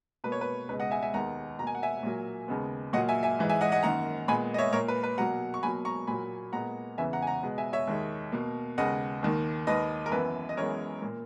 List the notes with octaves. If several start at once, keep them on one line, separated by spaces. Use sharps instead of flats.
B2 A#3 B4
C#5
B4
C#2 B2 G#3 B4
D#5 F#5
E5 G#5
E5 G#5
D#2 D#3 G#3 B3 F#5 A#5
B2 A#3 G#5 A#5
F#5
E5 G#5
A#2 F#3 A#3
D#2 C#3 G#3 B3
A#2 F#3 A#3 D#5 F#5
E5 G#5
E5 G#5
G#2 E3 G#3
E5 G#5
D#5 F#5
D#5 F#5
F#2 D#3 A#3 F#5 A#5
A#2 G#3 B3 G#5 B5
D#5
C#5 E5
A#2 A#3 A#4 C#5
B4
B4
B2 F#3 A#3 F#5 A#5
C#6
B2 F#3 A#3 G#5 B5
A#5 C#6
A#2 F#3 A#3 G#5 B5
A#2 G#3 B3 F#5 A#5
E2 C#3 E3 B3 E5 G#5
F#5 A#5
G#5
F#5 A#5
B2 G#3 B3
E5 G#5
C#5 E5
D#2 D#3 G#3
B2 A#3
D#2 C#3 G#3 B3 D#5 F#5
D#2 D#3 A#3
D#2 D#3 A#3 B4 D#5
A#4
F#2 E3 B3 B4
D#5
F#2 E3 G#3 B3 A#4 C#5
A#2 A#3